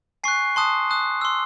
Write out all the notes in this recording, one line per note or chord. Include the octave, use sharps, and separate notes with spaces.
G#5 C#6 F#6 C7
A5 C6 D#6 F#6
A5 D#6 F#6
C6 E6